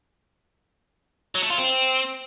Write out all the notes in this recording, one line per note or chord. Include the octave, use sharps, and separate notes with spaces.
F#3
A3
F4
C4